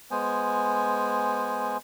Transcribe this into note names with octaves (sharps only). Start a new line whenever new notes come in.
G#3 B3 C5 G#5